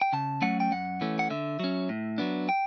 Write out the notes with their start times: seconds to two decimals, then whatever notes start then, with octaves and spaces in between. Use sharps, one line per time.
0.01 G5
0.13 C#3 A5
0.42 F#3 A3 C#4 F#5
0.60 G5
0.72 F#2 F#5
1.01 E3 A3 C#4
1.19 F#5
1.30 D3 E5
1.59 F#3 C#4
1.89 A2
2.18 F#3 B3 D4
2.49 G5